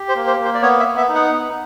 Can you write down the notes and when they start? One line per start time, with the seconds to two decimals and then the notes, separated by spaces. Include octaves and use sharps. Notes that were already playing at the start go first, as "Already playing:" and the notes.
Already playing: G4
0.09 C5
0.16 A#3
0.27 C5
0.39 A#3
0.45 C5
0.54 D5
0.62 B3 C#5
0.80 E5
0.85 B3
0.97 E5
1.09 D#4
1.15 F#5
1.33 B3